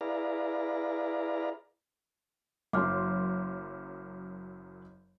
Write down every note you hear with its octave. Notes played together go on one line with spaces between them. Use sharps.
E4 G#4 B4 D5 F5 A#5
F#1 F#2 C6 D6 F6